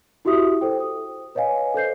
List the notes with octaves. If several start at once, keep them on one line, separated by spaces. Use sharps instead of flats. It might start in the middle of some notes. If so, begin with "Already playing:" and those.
E4 F#4 G4 E5 D#6
A4 C5 G5
D#6
B4 C#5 D#5 F5 G#5
A4 C5 G6 C7